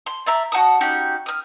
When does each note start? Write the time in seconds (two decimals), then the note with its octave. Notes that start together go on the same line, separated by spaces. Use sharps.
0.06 C6
0.26 D5 E5 A#5
0.52 F#4 F#5 A5 D#6
0.81 C#4 D#4 F#4 G4
1.26 D#6 F6